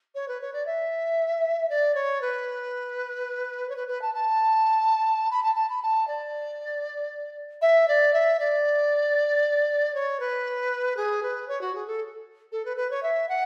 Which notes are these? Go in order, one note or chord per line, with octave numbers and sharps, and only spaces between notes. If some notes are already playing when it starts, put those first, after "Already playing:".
C#5
B4
C#5
D5
E5
D5
C#5
B4
C#5
B4
B4
A5
A5
B5
A5
A5
B5
A5
D5
E5
D5
E5
D5
C#5
B4
G#4
B4
C#5
F#4
G#4
A4
A4
B4
B4
C#5
E5
F#5